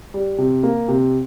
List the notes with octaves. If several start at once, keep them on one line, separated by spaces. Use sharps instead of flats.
G3
C3
A#3
C3